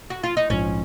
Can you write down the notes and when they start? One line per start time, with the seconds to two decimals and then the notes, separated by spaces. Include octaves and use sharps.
0.10 F#4
0.23 F4
0.37 D#4
0.50 A#1 G#2 F3 C#4